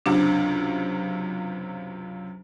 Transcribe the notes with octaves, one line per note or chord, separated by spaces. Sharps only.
C#2 F#2 C3 D4